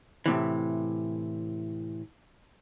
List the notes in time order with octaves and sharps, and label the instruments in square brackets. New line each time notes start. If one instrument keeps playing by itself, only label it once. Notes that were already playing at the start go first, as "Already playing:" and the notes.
[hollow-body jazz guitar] A2 C3 E3